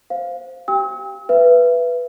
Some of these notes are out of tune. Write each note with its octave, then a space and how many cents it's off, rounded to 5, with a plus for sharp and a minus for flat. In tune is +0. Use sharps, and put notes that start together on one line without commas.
C5 +0 F5 +0
G4 -30 G5 +30 E6 -45
B4 +0 E5 +35